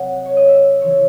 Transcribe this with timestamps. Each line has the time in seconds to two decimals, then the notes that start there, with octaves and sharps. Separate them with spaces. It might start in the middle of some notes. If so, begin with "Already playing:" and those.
Already playing: C3 F#3 C4 C#5 D#5 F#5
0.25 C#5
0.37 D#5
0.48 E5
0.81 C#3 E3 C4 C#5